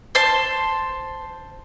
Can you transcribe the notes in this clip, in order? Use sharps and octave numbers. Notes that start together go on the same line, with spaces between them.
C5 A5 C6